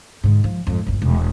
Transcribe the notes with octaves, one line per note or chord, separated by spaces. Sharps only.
G#2 D3
F3
F2 G#2
G1 E2
E1